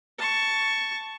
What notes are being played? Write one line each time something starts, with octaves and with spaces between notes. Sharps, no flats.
A5 C#6